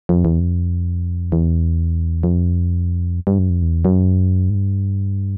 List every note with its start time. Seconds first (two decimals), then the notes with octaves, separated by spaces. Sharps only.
0.09 F2
0.25 E2
0.40 F2
1.32 E2
2.23 F2
3.27 G2
3.39 F#2
3.50 F2
3.62 E2
3.85 F#2
4.50 G#2
4.54 G2